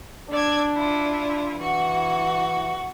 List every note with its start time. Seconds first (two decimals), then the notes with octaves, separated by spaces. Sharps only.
0.31 D4 D5 E6 G#6
0.75 E4 F4
1.57 E3 F#4